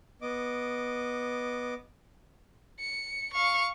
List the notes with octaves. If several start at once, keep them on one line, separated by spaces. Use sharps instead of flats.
B3 D#5 D6
C#7
F5 C#6